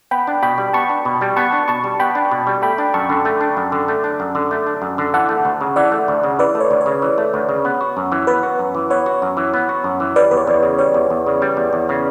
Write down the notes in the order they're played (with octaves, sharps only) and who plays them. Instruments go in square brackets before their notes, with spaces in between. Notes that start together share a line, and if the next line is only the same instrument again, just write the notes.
[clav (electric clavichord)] B3 [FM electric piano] G5 B5
[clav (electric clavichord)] D4
[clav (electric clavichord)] B2 [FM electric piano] G5 B5
[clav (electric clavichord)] G3
[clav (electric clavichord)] B3 [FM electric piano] A5 C#6
[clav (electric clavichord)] D4
B2
G3
[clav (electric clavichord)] B3 [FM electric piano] A5 C#6
[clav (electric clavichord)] D4
[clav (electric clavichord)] B2 [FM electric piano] A5 C#6
[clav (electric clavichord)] G3
[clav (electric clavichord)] B3 [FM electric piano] G5 B5
[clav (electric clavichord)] D4
B2
G3
[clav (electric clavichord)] A3 [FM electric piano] G5 B5
[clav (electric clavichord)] D4
[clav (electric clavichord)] F#2 [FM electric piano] A5 C#6
[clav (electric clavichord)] D3
A3
D4
F#2
D3
A3
D4
F#2
D3
A3
D4
F#2
D3
[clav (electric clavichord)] E3 [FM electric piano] F#5 A5
[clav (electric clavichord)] A3
D2
C#3
[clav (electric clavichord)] E3 [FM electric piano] D5 F#5
[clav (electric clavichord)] A3
D2
C#3
[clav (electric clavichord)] E3 [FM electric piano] B4 D5
[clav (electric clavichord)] A3
[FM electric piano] C#5
[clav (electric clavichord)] D2
[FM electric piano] C#5
[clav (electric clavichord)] C#3
E3
A3
D2
C#3
B3
F#4
F#2
E3
[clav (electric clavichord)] B3 [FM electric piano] B4
[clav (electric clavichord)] F#4
F#2
E3
[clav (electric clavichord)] B3 [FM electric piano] C#5
[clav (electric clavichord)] F#4
F#2
E3
B3
F#4
F#2
E3
[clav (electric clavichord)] G3 [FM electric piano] B4 D5
[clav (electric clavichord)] E2 [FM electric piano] B4
[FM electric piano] C#5
[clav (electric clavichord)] E2
C#3
[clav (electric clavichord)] G3 [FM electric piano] C#5
[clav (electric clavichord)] E2
E2
C#3
G3
E2
E2
C#3